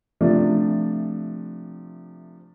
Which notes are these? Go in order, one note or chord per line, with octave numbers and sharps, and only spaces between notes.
C3 F3 A3 D4